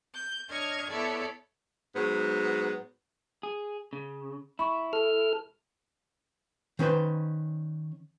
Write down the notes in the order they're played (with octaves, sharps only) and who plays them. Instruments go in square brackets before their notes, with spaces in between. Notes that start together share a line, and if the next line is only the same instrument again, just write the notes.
[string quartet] G6
D4 C#5 D#5 C#6 F6 G#6
B3 E4 A4 C#5 D5
[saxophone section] G#2 F#3 B3
[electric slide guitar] G#4
C#3
[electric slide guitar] E4 [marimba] B5 C#6
[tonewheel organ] A4 F6
[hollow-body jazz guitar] D#3 C#4 B4 C5